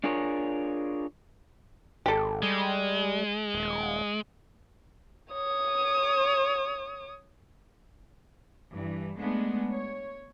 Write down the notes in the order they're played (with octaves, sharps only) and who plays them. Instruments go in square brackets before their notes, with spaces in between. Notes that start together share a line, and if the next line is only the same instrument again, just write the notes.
[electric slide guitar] D4 F4 G#4 A#4 C#5
[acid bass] G#1 [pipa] G4 A4
[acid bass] G3 [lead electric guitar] G#3
[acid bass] D#1
[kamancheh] C#5 D#6
[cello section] G2 E3
G#3 A3 B3 D4
C#5